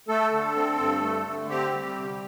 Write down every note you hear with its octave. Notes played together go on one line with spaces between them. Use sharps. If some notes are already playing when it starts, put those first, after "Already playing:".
A3 A4
D3
C4
G2
A3
D3
C4 G4
G3
C3